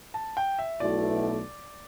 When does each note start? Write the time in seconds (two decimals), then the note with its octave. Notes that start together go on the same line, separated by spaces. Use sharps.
0.14 A5
0.37 G5
0.59 E5
0.80 B1 B2 A3 E4 D5